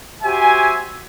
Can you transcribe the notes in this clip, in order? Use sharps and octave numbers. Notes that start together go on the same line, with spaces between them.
F#4 G4 C5 E5 G#5